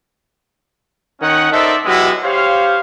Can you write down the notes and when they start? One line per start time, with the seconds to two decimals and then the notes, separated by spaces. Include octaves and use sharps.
1.22 D#3 C#4 D#4 F#5
1.52 D#4 A4 A#4 C5 D5 E5
1.85 F#3 G#3 B3 E4 F#4 G4
2.24 G4 C5 C#5 F5